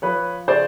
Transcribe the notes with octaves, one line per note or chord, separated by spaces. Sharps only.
F3 B4 C#5
C#3 C5 D5